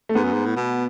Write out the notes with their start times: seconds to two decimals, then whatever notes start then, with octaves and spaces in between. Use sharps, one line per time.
0.09 A3
0.15 G#2 B3
0.24 F#2
0.33 G#2
0.46 A2
0.56 B2